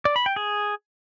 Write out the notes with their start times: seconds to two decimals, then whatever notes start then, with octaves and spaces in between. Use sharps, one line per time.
0.05 D5
0.16 B5
0.26 G5
0.36 G#4